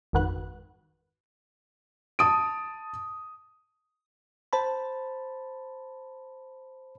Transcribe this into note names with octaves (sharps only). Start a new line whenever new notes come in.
G#1 F2 D#3 F#4 B4 F#6
A5 D#6 D7
C5 A5 B5